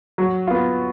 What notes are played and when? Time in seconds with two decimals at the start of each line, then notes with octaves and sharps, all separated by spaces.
0.18 F#3
0.47 B3 F4